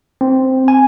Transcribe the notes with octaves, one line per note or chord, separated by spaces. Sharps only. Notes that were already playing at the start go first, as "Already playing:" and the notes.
C4
G#5